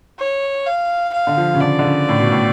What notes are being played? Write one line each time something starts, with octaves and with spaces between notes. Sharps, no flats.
C#5
F5
F5
D3
F3
C#3
D3 D5
D3
C#3
A2
B2
A2